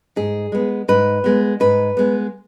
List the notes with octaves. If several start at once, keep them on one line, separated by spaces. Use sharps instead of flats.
G#2 G#4
G#3 B3
G#2 B4
G#3 B3
G#2 B4
G#3 B3